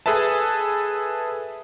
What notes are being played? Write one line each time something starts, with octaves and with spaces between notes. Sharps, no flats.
G#4 A4 B4 E5 A5